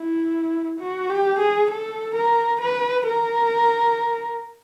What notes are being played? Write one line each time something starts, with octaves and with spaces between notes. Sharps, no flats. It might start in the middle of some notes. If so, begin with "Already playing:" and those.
Already playing: E4
F#4
G4
G#4
A4
A#4
B4
A#4